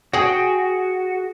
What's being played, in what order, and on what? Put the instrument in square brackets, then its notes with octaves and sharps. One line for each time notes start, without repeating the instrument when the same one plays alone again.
[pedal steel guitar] F#4 [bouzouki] G#4 G5